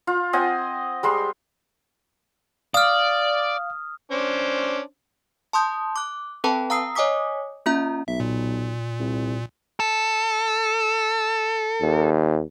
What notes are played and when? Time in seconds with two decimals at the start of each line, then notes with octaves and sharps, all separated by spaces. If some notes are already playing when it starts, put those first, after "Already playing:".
0.07 F4
0.33 C4 D#5 F#5 G#5
1.03 G3 G#3 C6
2.74 D5 F5 D#6 F6
4.12 C#4 D4 C5
5.53 A5 C6 D#6 G6
5.96 D6 F#6
6.44 C4 A4 B4 G5 A5 B5
6.70 F5 A#5 D#6 E6 C7
6.95 C#5 D#5 G#5 D6 D#6 B6
7.66 A#3 C#4 F4 E5 A#5
8.08 B1 E5
8.20 A#2
9.00 C2
9.80 A4
11.80 D#2